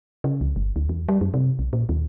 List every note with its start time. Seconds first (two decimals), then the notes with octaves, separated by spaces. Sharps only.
0.24 C#3
0.41 C#2
0.56 G1
0.76 D2
0.89 E2
1.09 G3
1.21 F#2
1.34 C3
1.59 B1
1.73 A#2
1.89 D#2